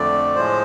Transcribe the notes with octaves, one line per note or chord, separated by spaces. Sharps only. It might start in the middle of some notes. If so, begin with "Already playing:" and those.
Already playing: F2 D3 A3 D5
A2 F3 G#3 C5